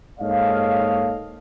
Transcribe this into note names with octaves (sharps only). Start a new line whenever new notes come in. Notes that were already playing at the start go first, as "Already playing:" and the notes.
G#2 A#3 A4 C#5 D#5 F5